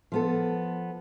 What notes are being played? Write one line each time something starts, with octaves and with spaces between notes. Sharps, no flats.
F3 B3 A4